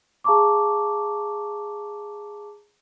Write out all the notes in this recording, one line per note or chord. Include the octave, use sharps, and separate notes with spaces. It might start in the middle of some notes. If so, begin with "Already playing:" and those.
G#4 F5 A5 A#5 C#6 D6